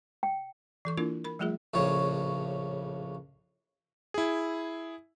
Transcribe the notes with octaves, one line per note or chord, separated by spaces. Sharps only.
G5
E3 A4 C#6
A#3 D4 E4 F4 A#4
A#4 B5
F3 G3 A3 F4 G#4 E5
A#1 A2 C#3 C#5
E4 G#4